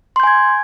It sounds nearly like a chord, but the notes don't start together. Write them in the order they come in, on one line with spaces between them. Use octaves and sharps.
C6 G6 G#5 G#6